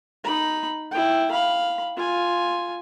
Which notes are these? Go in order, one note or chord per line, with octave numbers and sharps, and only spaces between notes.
D#4 B5
E4 G5
F5 B5
F4 G#5